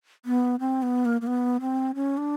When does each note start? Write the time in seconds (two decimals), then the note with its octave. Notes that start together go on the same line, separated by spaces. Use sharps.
0.25 B3
0.60 C4
0.82 B3
1.05 A#3
1.21 A#3
1.27 B3
1.61 C4
1.95 C#4
2.17 D4